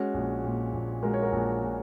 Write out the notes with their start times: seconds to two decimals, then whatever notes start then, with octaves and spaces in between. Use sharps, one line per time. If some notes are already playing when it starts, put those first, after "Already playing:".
Already playing: G#3 C#4 F#4
0.14 A#1
0.44 A#2
0.73 A#1
1.03 G#3 F#4 A#4
1.14 C#5
1.22 F#4 A#4
1.32 A#1
1.63 A#2